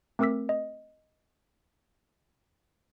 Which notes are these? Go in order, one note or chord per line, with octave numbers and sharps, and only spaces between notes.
A3 C4 A#4 D6 E6 B6
D#5